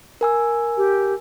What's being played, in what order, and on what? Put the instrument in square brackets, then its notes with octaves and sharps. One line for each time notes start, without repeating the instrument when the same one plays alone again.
[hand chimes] A#4 G#5 E6
[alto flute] G4